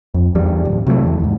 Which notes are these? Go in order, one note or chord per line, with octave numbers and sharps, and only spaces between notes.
F2
E2 G2 G3
D1
C3 F#3 G3 A3
E2 E3
D#2 G#2